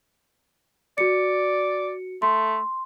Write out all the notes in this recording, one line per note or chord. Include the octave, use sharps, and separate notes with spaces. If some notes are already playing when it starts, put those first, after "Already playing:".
F#4 D5 C#7
A3 C6